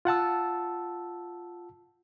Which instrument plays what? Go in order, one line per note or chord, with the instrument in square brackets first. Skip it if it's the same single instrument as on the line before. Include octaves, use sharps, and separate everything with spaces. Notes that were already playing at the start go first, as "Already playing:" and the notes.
[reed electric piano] F4 F#5 A5 E6